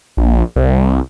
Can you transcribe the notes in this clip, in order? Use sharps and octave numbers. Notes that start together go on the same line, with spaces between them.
A#1
C2